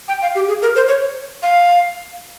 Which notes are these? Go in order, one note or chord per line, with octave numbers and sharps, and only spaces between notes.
G5
F5
G4
G#4
A#4
C5
C#5
F5